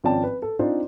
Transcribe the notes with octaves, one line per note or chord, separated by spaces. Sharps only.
G#1 F3 C#4 D5 G5 A5
B4
A4
C4 D4 D#4 F4 C5 D5